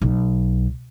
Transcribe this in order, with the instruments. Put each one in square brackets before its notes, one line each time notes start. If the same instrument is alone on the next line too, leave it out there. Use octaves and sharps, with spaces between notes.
[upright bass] B1